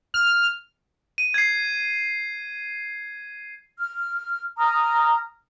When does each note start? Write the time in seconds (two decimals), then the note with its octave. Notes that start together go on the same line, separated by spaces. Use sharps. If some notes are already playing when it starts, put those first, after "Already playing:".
0.14 F6
1.18 D#7
1.34 G#6 C7
3.79 F6
4.58 A#5 D#6 F6